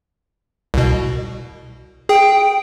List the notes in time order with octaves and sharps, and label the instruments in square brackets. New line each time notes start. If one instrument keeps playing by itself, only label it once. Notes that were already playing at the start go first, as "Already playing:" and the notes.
[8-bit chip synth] C2 B2
[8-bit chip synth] G#4 [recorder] G5